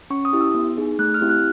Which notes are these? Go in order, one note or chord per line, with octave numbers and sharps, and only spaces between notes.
C#4 C#6
D#6
E4 G4
E6
B3
D#4 G#4
A3 F#6
F6
C4 E4 G4
F#6